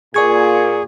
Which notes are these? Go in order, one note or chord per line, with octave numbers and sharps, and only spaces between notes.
A#2 G#4 D5 C#6 G#6